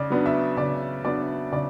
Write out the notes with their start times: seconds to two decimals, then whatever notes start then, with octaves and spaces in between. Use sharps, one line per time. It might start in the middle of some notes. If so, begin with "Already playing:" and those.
Already playing: C#3 D5
0.10 F#3 B3 D4
0.26 E5
0.57 C#3 D5
1.04 F#3 B3 D4 D5
1.52 C#3 D5